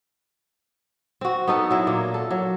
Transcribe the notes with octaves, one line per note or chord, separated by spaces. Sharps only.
C4 F#4
B3 D#4 A4 B4
F#3 E4
A#2 A#3 F4
A4
F#3